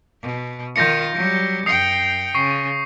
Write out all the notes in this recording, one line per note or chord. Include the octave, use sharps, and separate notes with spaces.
B2
D#3 F4 G6 A#6 C#7
F#3 G3
F#2 G5 D#6 C7 C#7
C#3 C#6 C7